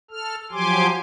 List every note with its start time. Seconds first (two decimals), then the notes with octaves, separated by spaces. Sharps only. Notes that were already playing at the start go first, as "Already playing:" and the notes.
0.11 A4 F6
0.51 F3 F#3 G4 G#5 C6 D6